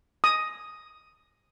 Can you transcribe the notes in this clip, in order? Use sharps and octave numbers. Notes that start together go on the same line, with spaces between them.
D#6